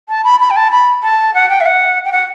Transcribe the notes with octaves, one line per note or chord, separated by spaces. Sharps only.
A5
B5
B5
G5
A5
B5
A5
F#5
G5
E5
F#5
G5
F#5